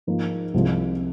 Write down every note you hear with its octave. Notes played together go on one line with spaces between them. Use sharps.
G#2 F3 A#3 D#4
C2 C3 F3 G#3 C4